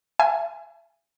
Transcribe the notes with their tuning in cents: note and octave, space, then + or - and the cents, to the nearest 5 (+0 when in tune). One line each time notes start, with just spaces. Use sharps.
E5 +45 G#5 +0